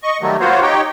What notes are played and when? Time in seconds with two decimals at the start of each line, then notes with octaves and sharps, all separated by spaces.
0.03 D#5 C#6
0.21 D#3 F#3 G3 A3
0.40 A#3 B3 F4 F#4 C5 C#5
0.62 D#4 G4 C#5 G5